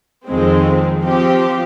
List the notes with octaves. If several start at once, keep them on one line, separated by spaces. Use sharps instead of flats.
F2 D#3 G#3 C4
F3 C4 G4